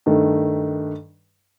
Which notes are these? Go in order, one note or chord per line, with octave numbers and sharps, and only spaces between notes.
G2 D#3 A3